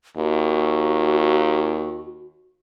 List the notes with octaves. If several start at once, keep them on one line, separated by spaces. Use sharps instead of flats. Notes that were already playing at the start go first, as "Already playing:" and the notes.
D#2 F#4